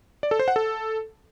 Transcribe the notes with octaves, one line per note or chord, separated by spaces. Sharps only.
D5
A4
C5
F#5
A4